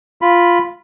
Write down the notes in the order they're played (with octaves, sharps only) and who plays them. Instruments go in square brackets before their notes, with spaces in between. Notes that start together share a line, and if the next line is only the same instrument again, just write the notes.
[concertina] F4 B5